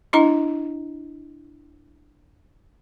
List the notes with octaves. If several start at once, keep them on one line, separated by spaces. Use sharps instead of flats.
D4 E4 D#5 A#5